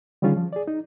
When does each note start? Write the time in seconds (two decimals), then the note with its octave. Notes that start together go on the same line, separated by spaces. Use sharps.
0.22 D3 D#3 G3 C#4 F4 G#4
0.37 F3
0.53 G#4 D5
0.67 D#4